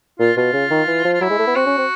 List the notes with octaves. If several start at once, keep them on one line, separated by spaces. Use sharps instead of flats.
A#2 F4
B2 F4
C#3
D#3
E3
F3
F4
F#3 E4
G#3
A3
B3
C4 F#4
C#4
C4